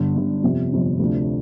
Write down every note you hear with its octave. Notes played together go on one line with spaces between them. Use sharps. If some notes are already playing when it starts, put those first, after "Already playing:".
Already playing: G1 G2 D3
G1 G2 D3
G1 F2 C3
G1 F2 C3
D2 C3 F3 A3 D4